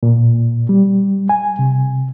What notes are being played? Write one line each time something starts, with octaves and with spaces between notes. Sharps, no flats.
A#2
G3
G#5
C3